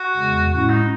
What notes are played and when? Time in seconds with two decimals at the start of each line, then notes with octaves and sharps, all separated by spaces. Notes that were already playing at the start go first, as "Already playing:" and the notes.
Already playing: F#4
0.17 E2 C#3 G#3
0.52 A2 G#3 C#4 E4 F#4
0.70 D#4